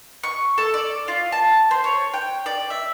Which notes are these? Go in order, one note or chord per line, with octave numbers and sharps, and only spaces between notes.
C#6
A4
D5
F4
A5
C5
C#5
G5
D5
E5